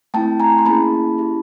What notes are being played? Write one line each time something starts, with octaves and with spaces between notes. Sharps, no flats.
A3 C4 E4 G5 A5
G#5 A#5
C6
A#3 C#4 E4 G#4 A5 B5
C#4 E4 G4